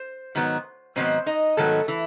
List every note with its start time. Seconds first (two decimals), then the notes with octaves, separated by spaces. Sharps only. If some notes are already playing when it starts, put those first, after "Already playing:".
Already playing: C5
0.35 G#2 D#3 F#3 B3
0.96 G#2 D#3 F#3 B3 C4 C5
1.26 D#4 D#5
1.57 G#2 D#3 F#3 A3 B3 A4
1.88 E3 E4